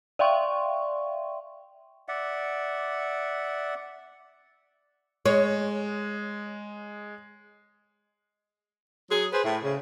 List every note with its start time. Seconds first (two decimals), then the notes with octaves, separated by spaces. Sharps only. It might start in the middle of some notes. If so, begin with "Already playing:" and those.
0.19 D5 E5 F5 G5 C6 C#6
2.08 D5 E5 F#5
5.26 G#3 C#5
9.11 F#3 G#4
9.33 G#4 B4 C5
9.44 A2
9.63 C#3